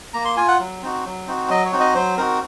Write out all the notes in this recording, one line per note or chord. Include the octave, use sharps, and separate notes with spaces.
A#3 A#5
C6
F4 G#5
F#5
F#3
C4 D#4 F#4
F#3
C4 D#4 F#4
F#3 D#5
C#5
C4 D#4 F#4
D#5
F#3 C5
C4 D#4 F#4 A#4